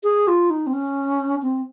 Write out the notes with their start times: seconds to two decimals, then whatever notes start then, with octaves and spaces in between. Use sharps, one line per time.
0.03 G#4
0.28 F4
0.50 D#4
0.67 C4
0.73 C#4
1.42 C4